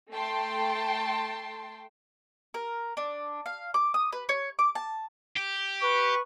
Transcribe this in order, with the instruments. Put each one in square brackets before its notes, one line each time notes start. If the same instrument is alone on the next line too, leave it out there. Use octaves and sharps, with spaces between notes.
[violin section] A3 G5 A5 C6
[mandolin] A#4
D4
F5
D6
D#6
B4
C#5
D6
A5
[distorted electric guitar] G4
[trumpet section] B4 C#6